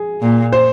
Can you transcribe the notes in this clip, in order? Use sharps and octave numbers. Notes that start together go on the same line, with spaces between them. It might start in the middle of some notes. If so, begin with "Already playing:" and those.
Already playing: G#4
A#2
C5